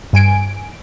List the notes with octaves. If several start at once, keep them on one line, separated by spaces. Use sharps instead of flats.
G2 G#5 D7